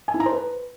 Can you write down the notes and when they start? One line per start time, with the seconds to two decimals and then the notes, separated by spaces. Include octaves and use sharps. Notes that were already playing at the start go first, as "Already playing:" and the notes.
0.08 G#5
0.14 E4
0.20 A#5
0.26 C5
0.32 B4